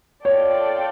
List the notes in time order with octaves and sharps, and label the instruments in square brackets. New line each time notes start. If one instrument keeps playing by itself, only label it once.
[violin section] F4 A4 D5 G5 [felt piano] C#5